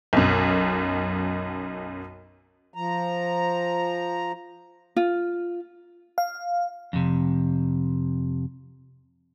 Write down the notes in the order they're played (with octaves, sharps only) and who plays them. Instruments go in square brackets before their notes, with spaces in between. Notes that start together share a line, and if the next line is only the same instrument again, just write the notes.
[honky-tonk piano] B1 F#2
[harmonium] F3 A#5
[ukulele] F4
[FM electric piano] F5
[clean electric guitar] F2 C3